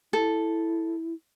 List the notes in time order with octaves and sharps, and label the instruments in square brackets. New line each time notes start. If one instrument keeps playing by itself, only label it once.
[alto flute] E4 [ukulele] A4